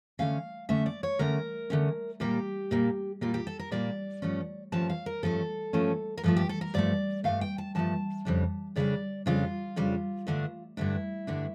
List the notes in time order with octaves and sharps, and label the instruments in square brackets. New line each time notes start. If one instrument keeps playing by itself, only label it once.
[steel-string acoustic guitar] D3 A3 C#4 F5
D3 A3 C#4 E5
D5
C#5
D3 A3 C#4 A#4
D3 A3 C#4
A#2 G3 A#3 G4
A#2 G3 A#3
A#2 G3 A#3 F4
G4
A4
A#4
A#2 G3 A#3 D5
G2 F3 A3 C#4
G2 F3 A3 C#4 A5
F5
A#4
G2 F3 A3 C#4 A4
G2 F3 A3 C#4
A#4
G2 F3 A3 A4
G4
A4
A#4
G2 F3 A3 D5
G2 F3 A3 F5
G5
A5
G2 F3 A3 A5
F2 C#3 G3 D4
F2 C#3 G3 D4 D5
F2 C#3 G3 D4 F4
F2 C#3 G3 D4
G2 D3 A3 D4
G2 D3 A3 D4 E4
G2 D3 A3 D4